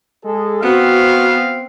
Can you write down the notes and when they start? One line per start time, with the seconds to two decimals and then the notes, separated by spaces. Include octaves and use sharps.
0.24 G#3 G#4 A4
0.62 B3 C4 F#4 F5